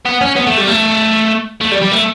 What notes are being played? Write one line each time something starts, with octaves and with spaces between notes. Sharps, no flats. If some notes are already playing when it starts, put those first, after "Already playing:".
B3
C#4
B3
A3
G3
A3
A3
G3
G3
A3